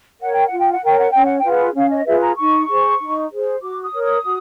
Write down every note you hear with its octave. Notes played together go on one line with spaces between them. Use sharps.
A#4 C#5 F#5
G5
F4 F#5
G5
F#5
A#4 C#5 G5
F#5
C#4 G5
F#5
G5
F4 G#4 B4
F#5
C#4 F5
D#5
F4 G#4 B4 E5
A#5
D#4 C#6
G#4 C5
D#4
G#4 C5
F#4 D6
D#6
A#4 C#5
D#6
F#4